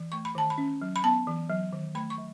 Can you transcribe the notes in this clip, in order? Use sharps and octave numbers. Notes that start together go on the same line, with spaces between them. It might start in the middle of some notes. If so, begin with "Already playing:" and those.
Already playing: E3
A3 C#6
B5
D#3 A5
B5
C#4
F#3
B5
B3 A5
E3
F#3
D#3
A3 B5
C#6
F#3